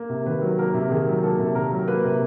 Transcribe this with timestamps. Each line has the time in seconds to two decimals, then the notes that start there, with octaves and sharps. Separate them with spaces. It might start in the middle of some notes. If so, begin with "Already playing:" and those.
Already playing: A#3
0.09 C3
0.26 D#3 B4
0.42 F#3
0.59 A#3 A#4
0.74 C3
0.91 D#3 G#4
1.07 F#3
1.23 A#3 A4
1.39 C3
1.55 D#3 A#4
1.72 F#3
1.88 A#3 B4
2.04 C3